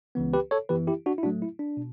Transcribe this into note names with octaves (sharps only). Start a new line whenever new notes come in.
C#2 C#3 E3 B3
G4 B4
A4 C#5
F#2 E3 B3 G4 B4
E4 G4
D4 F#4
E4
A2 F#3 A3 D4 F#4
E4
D4
B2